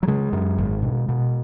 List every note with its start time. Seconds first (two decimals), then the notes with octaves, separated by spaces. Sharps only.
0.03 F#3
0.07 C#3 G#3
0.33 F#2
0.58 G#1
0.82 B2
1.09 B2